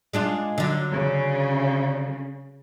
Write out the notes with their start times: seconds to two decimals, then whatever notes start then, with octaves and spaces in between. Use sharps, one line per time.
0.13 G#3 D4 F4
0.58 D3 F#3
0.91 C#3